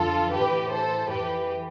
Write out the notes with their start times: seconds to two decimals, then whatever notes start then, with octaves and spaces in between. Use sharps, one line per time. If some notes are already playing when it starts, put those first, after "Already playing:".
Already playing: F2 D3 F3 F4 A4
0.32 A2 E3 G4 B4
0.71 A4 C5
1.11 F2 E3 G4 B4